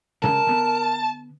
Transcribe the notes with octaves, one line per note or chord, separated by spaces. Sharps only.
D2 C#3 G#3 A#4 A5
D3 B3